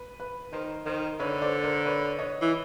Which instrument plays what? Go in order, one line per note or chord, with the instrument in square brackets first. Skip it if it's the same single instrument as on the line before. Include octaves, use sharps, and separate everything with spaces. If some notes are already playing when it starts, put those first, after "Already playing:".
Already playing: [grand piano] B4
B4
[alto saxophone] D#3 [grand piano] A#4 C5
[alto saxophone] D#3 [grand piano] A#4 C5
[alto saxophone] D3 [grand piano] B4 C#5
[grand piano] C5 D5
A#4 C5
B4 C#5
C#5 D#5
[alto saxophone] E3